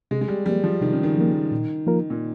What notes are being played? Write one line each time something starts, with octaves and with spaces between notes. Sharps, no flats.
C3 G#3
G#3
G3
F3 G3 A#3
F3
C3 D#3
C#3
D#3
F3 A#3
A#2
F3 A#3 F4 A#4
A#2